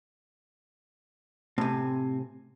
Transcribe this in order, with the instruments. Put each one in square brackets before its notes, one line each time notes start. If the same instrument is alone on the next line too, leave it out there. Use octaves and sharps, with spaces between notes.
[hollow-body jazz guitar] A2 C3 [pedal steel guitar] C4 G#5